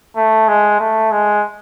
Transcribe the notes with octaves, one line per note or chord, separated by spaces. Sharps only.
A3
G#3
A3
G#3